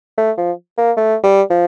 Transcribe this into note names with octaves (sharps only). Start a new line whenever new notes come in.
A3
F3
A#3
A3
G3
F3